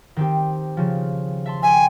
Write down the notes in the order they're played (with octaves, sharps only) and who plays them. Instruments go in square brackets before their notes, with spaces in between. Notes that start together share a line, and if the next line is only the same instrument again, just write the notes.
[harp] D#3 C4 G4
C#3 F3
E5 A5 C6
[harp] E5 G5 [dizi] G#5